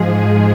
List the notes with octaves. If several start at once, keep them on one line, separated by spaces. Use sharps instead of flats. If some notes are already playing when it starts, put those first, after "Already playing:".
Already playing: G#2 F3 G#3 G#4